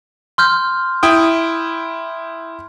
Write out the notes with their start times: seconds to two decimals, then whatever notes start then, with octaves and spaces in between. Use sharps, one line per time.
0.38 C6 F6 G6
1.03 E4 G5 D#6